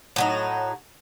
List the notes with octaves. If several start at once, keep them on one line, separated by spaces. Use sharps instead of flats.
A2 F#3 D#4